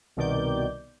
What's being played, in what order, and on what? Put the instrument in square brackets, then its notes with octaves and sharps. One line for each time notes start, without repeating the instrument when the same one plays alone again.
[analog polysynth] C2 B2 D#3 D5 D6 G6